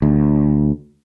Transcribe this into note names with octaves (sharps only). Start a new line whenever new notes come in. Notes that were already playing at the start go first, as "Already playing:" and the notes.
D2